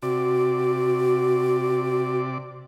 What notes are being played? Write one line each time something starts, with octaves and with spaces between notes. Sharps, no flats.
C3 F#4 D5